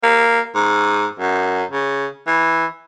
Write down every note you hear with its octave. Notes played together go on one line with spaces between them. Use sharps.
A#3
G#2
F#2
C#3
E3